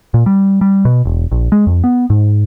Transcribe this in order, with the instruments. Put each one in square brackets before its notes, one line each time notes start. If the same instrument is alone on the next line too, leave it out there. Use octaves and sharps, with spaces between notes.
[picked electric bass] A#2
G3
G3
B2
E1
A#1
G#3
F2
B3
G#2